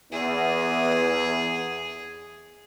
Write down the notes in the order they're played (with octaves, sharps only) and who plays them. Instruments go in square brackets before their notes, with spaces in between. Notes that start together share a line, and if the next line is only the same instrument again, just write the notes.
[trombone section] E2 [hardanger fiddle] G#4